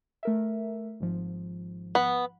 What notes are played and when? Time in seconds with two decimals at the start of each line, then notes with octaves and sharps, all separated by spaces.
0.23 A3 A#4 E5
1.00 G#1 G#2 F3
1.95 B3